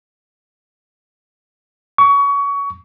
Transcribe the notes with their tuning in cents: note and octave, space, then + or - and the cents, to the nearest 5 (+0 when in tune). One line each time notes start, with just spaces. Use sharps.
C#6 +25